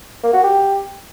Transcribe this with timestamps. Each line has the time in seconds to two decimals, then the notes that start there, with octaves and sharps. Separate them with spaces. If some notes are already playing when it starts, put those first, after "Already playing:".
0.24 A#3
0.34 F#4
0.44 G4